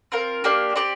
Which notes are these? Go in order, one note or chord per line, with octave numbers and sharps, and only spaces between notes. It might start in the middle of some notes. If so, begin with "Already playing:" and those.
C4 F4 A#4
A#3 D4 G4 D5
C4 G4 D5